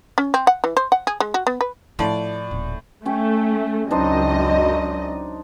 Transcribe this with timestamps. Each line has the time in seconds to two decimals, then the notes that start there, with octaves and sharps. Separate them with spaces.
0.18 C#4
0.34 C4
0.47 F#5
0.64 E3
0.77 C5
0.92 F#5
1.07 G#4
1.20 G#3
1.34 F#4
1.47 B3
1.61 B4
1.99 A2 F3 E4 D5
2.51 D#1
3.06 A3 C#4 G5
3.91 C#2 F#2 D4 D#4 C5 D#5